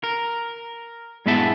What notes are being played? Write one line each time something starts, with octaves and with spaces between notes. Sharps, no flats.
A#4
G#2 G#3 B3 E4 E5 A5